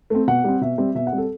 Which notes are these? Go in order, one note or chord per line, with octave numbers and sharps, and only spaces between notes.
A3 C4
B2 F#5
G3 C4
B2 E5
G3 C4
B2 E5
F#5
G3 C4
A4